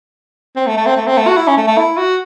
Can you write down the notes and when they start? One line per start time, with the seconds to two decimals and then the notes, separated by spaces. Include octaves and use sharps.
0.56 C4
0.67 A3
0.77 A3
0.87 C4
0.97 A3
1.07 C4
1.17 A3
1.27 F#4
1.37 E4
1.47 C#4
1.57 A3
1.67 A3
1.77 E4
1.97 F#4